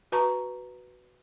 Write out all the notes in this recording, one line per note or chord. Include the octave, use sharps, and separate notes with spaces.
F#4 B4 A5 A#5 C#6